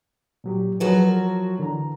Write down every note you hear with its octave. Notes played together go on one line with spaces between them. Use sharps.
A#2 F#3 G4
F3 F#3 F#4 G#4 A#4 B4
A#4
D3 E3 A#5